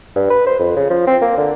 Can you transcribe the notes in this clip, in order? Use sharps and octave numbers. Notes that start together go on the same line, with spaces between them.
G2
B4
C5
F2
C#3
F3
C4
A#3
D3